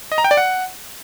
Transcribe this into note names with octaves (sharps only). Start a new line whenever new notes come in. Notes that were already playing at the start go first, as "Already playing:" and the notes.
D#5
A#5
G5
D5
F#5